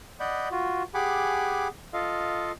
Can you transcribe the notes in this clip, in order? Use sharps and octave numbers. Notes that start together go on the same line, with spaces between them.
D5 D#5 F#5 B5 G6
F4 F#4
G4 G#4 F#5 G#5 B5 D6
F4 A4 D#5 F5